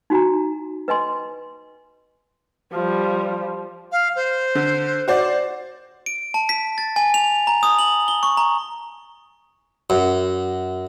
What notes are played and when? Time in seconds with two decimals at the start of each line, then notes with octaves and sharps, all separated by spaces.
0.10 D#4 F#4 G#5 A#5
0.88 B4 D#5 G#5 C6
2.73 F3 G3
3.92 F5
4.16 C5
4.55 D3
5.08 F#4 C5 D5
6.06 D7
6.34 A5
6.49 B6
6.78 A6
6.96 G#5
7.14 F7
7.47 A#5
7.63 D#6
7.79 F#7
8.08 G7
8.23 C#6
8.37 A#5
9.90 F#2